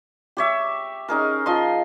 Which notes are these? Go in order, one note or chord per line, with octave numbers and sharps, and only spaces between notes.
G4 C#5 E5
C#4 D#4 G#4 A#4
F3 D#5 C6